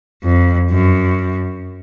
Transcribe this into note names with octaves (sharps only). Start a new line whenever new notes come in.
F2
F#2